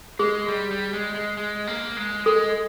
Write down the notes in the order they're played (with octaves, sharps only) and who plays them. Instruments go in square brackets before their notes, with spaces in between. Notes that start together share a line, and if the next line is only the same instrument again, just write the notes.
[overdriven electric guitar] G#3 [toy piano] G#4
[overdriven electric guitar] G3
G3
G#3
G#3
G#3
A#3
G#3
[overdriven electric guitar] G#3 [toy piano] A4